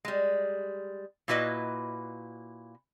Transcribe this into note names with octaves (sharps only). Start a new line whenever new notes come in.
G3 G#3
A#2 A#3 E4 F#4 B4 D#5